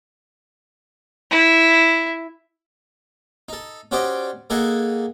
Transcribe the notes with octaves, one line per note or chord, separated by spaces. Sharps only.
E4
D#4 A4
C#4 F#4 G4 C5 D5 D#5
A#3 D#4 G#4 A4 D#5 F#5